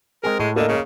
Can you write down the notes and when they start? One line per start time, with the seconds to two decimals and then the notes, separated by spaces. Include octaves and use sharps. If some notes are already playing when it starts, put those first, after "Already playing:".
0.24 G#3 C4 G#4 A#4
0.40 A2 G#3
0.56 D3 A#3 D#5
0.68 C#3